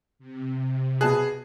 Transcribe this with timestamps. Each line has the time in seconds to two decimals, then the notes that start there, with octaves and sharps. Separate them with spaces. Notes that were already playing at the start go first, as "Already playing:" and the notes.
0.19 C3
1.01 B2 G#4 A5 F#6